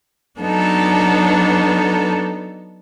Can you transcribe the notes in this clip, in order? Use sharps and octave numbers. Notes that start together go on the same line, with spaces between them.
F#3 B3 D4 D#4 A4